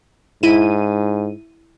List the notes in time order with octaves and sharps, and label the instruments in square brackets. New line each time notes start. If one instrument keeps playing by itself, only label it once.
[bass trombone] G#2 [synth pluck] E4 D#7